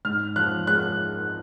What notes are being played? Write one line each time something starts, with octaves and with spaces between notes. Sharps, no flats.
G#2 F6
F3 F#6
G#3 F#6